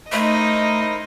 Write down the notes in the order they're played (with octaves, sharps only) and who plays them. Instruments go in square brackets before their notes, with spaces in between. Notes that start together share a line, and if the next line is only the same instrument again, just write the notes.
[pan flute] A3 [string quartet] D#4 D#5 [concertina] E4 A#4 C5